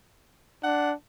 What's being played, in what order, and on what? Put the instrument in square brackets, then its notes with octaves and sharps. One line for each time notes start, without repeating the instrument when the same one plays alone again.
[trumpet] D4 [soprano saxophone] F#5